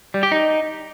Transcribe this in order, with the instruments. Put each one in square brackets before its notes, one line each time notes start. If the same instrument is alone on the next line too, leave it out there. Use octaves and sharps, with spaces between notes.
[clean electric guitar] G3
G4
D#4